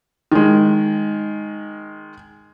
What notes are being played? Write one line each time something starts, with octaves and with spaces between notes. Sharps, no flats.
D#3 G#3